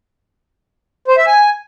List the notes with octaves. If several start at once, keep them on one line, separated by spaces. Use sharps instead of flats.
C5
E5
G#5